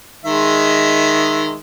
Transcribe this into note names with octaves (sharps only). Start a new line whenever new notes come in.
D#3 G#3 E5